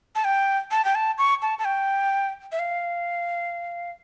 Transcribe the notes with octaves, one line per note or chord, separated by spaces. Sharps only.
A5
G5
A5
G5
A5
C#6
A5
A5
G5
E5
F5